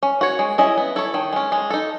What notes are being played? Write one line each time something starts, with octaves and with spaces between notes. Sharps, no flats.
C#4
F#4 C#5
G#3
C#4 E4 G#4 D#5
B3
E4 A4 C#5
D#3
G#3 C#4
G#3
D#4 A4